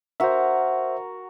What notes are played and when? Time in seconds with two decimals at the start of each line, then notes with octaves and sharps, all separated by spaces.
0.20 F#4 A#4 C5 E5